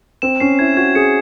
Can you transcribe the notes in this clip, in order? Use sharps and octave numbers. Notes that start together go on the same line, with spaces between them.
C4 E7
C#4 C7
E4 G#6
F#4 G#6
G#4 C#7